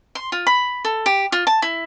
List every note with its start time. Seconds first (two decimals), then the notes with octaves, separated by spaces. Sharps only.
0.15 C6
0.32 F4
0.47 B5
0.85 A4
1.06 G4
1.32 F4
1.47 A5
1.62 E4